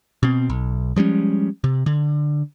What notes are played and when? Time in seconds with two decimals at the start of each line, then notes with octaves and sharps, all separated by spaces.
0.23 B2 C4
0.49 B1
0.96 F3 G3 G#3 C#4
1.64 C3
1.86 D3